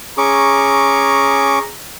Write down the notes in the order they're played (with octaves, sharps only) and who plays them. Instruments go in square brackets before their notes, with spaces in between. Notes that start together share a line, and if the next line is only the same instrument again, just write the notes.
[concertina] C#4 C#6 D6 [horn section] G#4 A#5